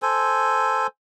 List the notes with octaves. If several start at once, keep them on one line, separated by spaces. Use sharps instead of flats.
A4 C5 G#5